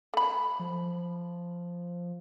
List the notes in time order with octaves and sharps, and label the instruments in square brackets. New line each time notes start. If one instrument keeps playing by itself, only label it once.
[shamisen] A3 B5
[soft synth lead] F3